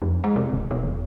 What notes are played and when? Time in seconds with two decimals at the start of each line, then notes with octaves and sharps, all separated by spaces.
0.02 F2
0.24 G#3
0.36 C3
0.53 D1
0.71 B2
0.83 E1